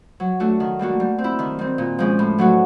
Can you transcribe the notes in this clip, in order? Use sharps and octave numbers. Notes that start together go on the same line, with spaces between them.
F#3
A3 D4 F#4
D#3
G3 A#3 D4 F#4
G3
C4
E4
D#3
G3 C4
A#2
F3 G#3 C#4
A2
F#3 A3 D4 F#4